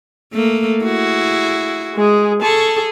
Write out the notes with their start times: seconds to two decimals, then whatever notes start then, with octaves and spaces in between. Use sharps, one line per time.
0.33 A3 A#3
0.84 E4 F#4 G#4
1.95 G#3 G#4
2.42 G#4 A4 A5 C#6